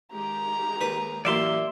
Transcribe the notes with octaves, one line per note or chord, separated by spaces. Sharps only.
D#3 G#3 G4 A#5
D#2 B4
A1 F#2 A#3 D5 E5 F5 C6